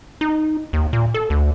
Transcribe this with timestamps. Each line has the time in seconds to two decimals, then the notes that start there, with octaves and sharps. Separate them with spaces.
0.21 D#4
0.73 D#2
0.93 A#2
1.14 A4
1.30 D2